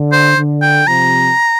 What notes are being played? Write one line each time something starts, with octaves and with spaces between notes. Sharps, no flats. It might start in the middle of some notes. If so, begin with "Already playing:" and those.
Already playing: D3
C5
D3
G5
C3 F3 A#5